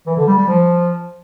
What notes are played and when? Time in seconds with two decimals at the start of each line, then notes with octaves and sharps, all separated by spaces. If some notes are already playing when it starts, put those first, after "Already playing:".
0.06 E3
0.17 D3
0.27 G3
0.37 G3
0.48 F3